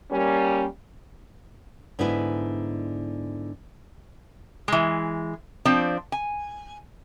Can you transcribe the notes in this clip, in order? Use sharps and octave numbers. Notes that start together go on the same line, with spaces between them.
G3 A#3 C#4
G#2 D3 B3 E4 G#5
E3 G#3
F3 C4 D4
G#5